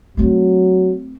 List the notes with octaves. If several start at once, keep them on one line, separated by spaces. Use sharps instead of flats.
F#3 A3 C4